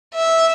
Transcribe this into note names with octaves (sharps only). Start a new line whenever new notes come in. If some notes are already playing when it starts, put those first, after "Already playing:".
E5